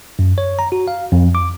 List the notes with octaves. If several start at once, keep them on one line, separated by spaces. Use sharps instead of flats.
F#2
C#5
A#5
F#4
F5
F2
D6